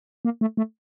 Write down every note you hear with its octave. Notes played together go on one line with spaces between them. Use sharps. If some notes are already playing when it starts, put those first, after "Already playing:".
A#3
A3
A3